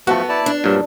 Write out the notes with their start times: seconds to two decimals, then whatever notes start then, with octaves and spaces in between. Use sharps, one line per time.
0.07 F3 A3 B3 F#4 A4
0.29 E4 D5 A5
0.46 D4
0.64 G2 A#2 F#3